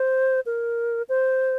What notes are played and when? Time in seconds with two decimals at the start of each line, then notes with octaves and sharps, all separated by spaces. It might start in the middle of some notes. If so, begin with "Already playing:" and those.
Already playing: C5
0.46 A#4
1.09 C5